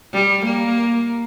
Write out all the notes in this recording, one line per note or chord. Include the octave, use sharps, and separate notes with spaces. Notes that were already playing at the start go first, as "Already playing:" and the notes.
G3
A#3